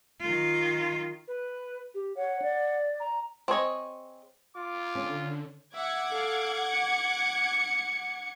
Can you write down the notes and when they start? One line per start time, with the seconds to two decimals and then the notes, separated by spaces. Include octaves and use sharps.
0.21 D#3 F4
1.28 B4
1.94 G4
2.17 C#5 F#5
2.42 D5
3.00 A#5
3.48 C4 G#4 C#5 D#5
4.56 F4 D6
4.95 D3 C#4
5.75 E5 F#5 D6 G#6
6.10 A4 F5
6.70 C#7